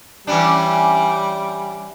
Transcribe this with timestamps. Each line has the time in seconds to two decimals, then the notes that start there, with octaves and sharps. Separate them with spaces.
0.27 E3 G3 C#4 D4